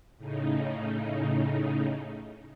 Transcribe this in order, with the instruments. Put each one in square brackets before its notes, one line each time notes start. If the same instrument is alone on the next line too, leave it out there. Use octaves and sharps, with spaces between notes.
[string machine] A2 C#3 D#4